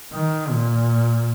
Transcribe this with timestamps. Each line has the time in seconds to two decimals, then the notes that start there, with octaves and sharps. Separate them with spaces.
0.13 D#3
0.50 A#2